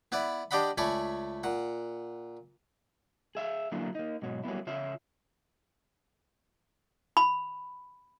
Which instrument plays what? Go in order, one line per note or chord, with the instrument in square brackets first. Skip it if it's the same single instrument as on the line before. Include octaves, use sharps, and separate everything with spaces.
[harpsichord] B3 E4 B4 D5
D4 G4 D5 D#5 F#5 B5
C#2 A3 D5 G#5 B5 C#6
A#2 F#5
[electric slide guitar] G#4 E5 F5
D3 F#3 A#3 D4 E4 F4
A#3 D#4
G#2 B2 F#3
F#3 G3 A#3 B3 E4
C#3 F4 C#5 E5
[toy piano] B5